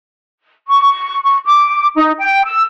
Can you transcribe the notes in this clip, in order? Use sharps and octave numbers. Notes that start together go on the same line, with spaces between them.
C#6
C#6
D6
D#4
G5
E6